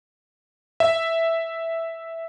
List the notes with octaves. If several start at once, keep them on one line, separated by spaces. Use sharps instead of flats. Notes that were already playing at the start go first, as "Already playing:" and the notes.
E5